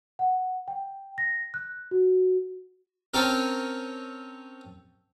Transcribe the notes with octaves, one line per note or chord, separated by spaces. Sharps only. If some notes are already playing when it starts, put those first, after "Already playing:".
F#5
G5
A#6
F#6
F#4
C4 C#4 A4 A#4